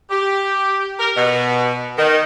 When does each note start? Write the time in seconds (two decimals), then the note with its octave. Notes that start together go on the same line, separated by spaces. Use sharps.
0.10 G4
0.99 A#4
1.17 B2
1.97 D#3